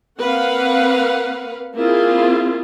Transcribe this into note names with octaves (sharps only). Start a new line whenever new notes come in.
A#3 C4 B4 F5 F#5
A#3 C4 E4 F4 G#4